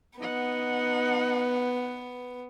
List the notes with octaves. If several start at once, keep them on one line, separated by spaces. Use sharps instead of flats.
B3 D#4 F#5